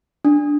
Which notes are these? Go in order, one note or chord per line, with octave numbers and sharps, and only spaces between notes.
D4